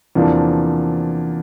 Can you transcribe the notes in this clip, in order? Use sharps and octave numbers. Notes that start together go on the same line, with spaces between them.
E2 C3 F3 A#3 D4